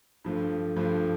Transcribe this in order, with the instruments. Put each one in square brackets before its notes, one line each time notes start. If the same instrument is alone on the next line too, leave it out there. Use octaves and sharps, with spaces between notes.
[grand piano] G2 F3 A3
G2 F3 A3